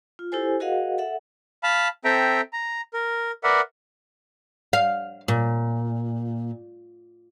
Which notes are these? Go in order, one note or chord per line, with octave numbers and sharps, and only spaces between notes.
F4
E4 G4 A4 C5 G#5
F#4 G#4 A#4 D#5 F5 F#5
A4 E5 F#5
F5 A5 B5
C4 A4 E5 G5 A#5
A#5
A#4
A#4 B4 D5 E5 F#5
F5
A#2